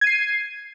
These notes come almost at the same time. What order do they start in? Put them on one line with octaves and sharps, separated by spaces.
G#6 D#7 C7